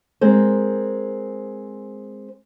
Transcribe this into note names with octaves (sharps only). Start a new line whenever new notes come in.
G#3 C4 A#4 C5